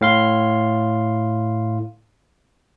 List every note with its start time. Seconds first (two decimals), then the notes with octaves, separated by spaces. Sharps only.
0.01 A2 F5 C6